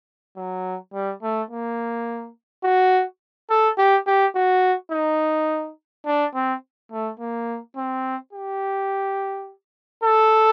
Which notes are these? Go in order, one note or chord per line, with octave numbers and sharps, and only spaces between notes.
F#3
G3
A3
A#3
F#4
A4
G4
G4
F#4
D#4
D4
C4
A3
A#3
C4
G4
A4